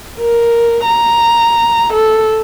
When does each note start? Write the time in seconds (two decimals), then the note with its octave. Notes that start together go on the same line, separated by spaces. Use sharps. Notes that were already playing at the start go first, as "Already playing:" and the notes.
0.19 A#4
0.85 A#5
1.93 A4